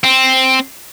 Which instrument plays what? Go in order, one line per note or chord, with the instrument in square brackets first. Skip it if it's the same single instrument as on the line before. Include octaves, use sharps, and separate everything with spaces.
[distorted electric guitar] C4